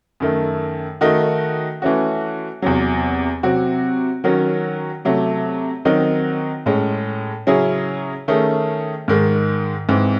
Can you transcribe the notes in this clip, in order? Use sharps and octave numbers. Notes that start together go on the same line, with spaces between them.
F#2 D#3 A3
D#3 A3 D#4 F#4
E3 A3 C#4 F#4
E2 C3 F#3
C3 F#3 C4 F#4
D#3 F#3 C#4 F#4
C3 F#3 A3
D#3 F#3 C4 D#4 F#4
A2 G#3 C#4
C#3 F#3 C#4 E4 G#4
D#3 A3 C#4 G#4
G#2 D#3 G#3
G#2 E3 C4